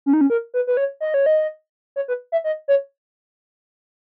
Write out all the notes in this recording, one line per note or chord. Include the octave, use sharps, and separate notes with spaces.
C#4
D#4
C#4
A#4
B4
B4
C#5
D#5
C#5
D#5
C#5
B4
E5
D#5
C#5